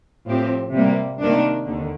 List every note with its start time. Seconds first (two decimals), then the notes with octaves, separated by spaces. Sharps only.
0.26 A2 F3 C4 G4
0.73 C3 G3 A#3
1.20 C3 D#3 A#3 D4
1.66 D#2 D3